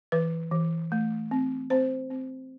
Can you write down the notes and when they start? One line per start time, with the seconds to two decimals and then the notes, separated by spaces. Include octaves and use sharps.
0.12 E3 B4
0.51 E3
0.92 A3
1.31 C4
1.70 C4 C5
2.10 C4